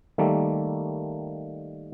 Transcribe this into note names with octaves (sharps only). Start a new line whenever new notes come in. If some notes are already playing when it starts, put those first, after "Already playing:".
D#3 G3 A3 A#3